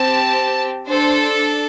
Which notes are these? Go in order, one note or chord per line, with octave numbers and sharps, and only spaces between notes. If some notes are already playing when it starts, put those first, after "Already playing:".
Already playing: C4 G4 A5
D4 A4 C5